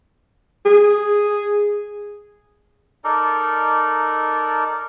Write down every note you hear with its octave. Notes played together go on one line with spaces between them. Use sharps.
G#4
D#4 A4 A#4 D5